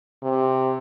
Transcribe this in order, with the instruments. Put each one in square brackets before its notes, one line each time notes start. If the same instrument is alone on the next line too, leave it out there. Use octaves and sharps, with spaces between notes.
[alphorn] C3